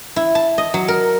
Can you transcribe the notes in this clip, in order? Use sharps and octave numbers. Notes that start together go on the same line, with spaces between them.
E4
A5
D#5
F#3
A#4